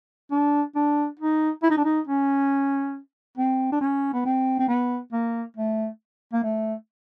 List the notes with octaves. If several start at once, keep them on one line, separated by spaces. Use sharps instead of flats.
D4
D4
D#4
E4
D#4
D4
D#4
C#4
C4
D4
C#4
B3
C4
C4
B3
A#3
A3
A#3
A3